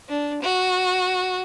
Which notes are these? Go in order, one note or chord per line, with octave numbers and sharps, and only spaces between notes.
D4
F#4